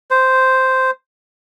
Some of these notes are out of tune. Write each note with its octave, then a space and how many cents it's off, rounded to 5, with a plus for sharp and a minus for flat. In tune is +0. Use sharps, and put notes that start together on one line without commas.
C5 -5